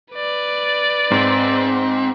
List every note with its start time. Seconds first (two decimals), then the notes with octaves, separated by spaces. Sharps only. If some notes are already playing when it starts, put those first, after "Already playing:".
0.14 B4 D5
1.11 G#2 C4